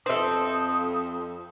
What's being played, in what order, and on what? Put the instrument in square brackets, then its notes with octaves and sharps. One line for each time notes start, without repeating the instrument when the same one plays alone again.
[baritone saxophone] F2 [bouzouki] C4 A4 [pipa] C5 E5 [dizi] D#6